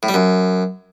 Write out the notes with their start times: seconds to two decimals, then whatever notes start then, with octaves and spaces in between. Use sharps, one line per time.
0.03 A2
0.09 G3
0.14 F#2